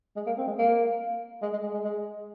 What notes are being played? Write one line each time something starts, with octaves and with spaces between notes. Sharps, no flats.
G#3
A#3
C4
G#3
A#3
G#3
G#3
G#3
G#3
G#3